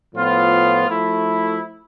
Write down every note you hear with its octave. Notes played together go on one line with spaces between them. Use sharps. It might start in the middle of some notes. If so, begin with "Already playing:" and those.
A2 F3 B3 F4
F3 A3 E4